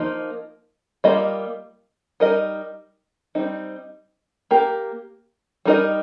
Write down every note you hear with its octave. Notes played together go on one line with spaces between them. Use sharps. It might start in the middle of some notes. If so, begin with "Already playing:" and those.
Already playing: F3 A#3 D#4
G3 A#3 F4 D#5
G3 D#4 A#4 D#5
G3 C4 D#4
A#3 G4 A#4
G3 D#4 A#4 D#5